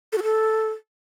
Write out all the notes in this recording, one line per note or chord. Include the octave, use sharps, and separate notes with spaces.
A4
F#4
A4